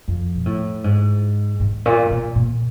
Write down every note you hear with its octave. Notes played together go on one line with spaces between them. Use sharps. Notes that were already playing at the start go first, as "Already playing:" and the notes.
F2
A#2
A2
G#2
G#2
A#2
A#2
A#2